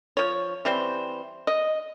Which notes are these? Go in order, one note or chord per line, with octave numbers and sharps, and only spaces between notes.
F3 C#5
E3 G3 C4 C5
D#5